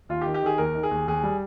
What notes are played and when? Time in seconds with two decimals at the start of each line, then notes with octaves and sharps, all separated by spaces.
0.09 D#2 F4
0.21 G4
0.26 D#3
0.34 G4
0.42 D#3 G#4
0.58 D#2 A#4
0.75 D#3
0.83 G#4
0.91 D#2
1.08 D#2 G#4
1.23 G3